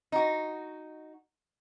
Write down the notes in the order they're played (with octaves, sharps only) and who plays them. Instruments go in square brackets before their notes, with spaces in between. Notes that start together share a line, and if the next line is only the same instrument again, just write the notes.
[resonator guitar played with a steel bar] D#4 F#4